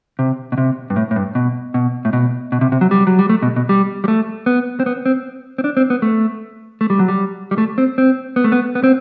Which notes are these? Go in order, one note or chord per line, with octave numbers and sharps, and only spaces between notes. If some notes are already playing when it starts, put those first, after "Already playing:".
C3
B2
C3
G2
A2
A2
G2
B2
B2
A2
B2
B2
C3
C3
F#3
G3
F#3
G3
A3
B2
B2
G3
G3
A3
B3
C4
B3
C4
C4
D4
C4
B3
A3
A3
G3
F#3
G3
G3
A3
C4
C4
B3
A3
B3
B3
C4